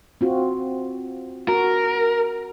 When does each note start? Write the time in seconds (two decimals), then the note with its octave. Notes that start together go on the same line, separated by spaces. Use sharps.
0.21 C4 F4 F#4
1.48 F#4 A#4